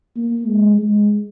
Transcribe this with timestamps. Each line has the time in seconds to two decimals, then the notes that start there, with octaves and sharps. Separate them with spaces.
0.17 A#3
0.47 G#3
0.78 G#3